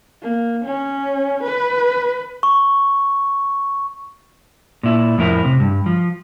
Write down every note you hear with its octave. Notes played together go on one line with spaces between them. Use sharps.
A#3
C#4
B4
C#6
A#2 E4
F2 A2 E4 A#4
C3
G2
F3